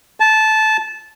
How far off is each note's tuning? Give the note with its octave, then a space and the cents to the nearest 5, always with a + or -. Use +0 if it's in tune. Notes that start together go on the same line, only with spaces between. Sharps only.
A5 -15